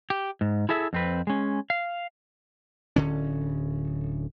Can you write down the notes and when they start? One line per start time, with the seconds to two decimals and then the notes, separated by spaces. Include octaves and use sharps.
0.10 G4
0.41 G#2
0.69 E4 G#4 A4 E5
0.93 F2 C4 B4
1.27 G#3 C#4
1.70 F5
2.96 D1 D3 C#4